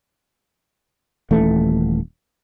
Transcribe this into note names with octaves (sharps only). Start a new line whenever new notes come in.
D#1 E3 A3